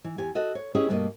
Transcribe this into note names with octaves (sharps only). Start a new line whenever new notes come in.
E3
E2 G4 G#5
F#4 A4 D#5 E5
C#5
C#4 E4 G4 G#4 B4 D#5
G2 B2 F3 A3 A#3 D#5